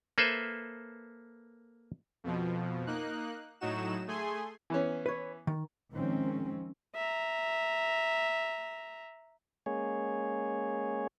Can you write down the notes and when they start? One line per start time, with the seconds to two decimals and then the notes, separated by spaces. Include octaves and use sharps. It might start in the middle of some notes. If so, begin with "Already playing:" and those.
0.18 A#3 A4 B4 C5 E5
2.24 F2 B2 F3
2.87 A#3 D#4 F#6
3.60 A2 F#3 D#4 F#4 E7
4.07 A3 G#4 G#5 C6
4.70 E3 B3 C#4
5.06 B4 C#5
5.47 D#3
5.91 D#3 F3 G#3 C4 C#4
6.95 E5 A#5
9.66 G#3 A#3 C#4 G#4 C#5